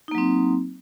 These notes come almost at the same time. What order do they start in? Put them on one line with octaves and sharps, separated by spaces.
D#4 A#3 F#3 C4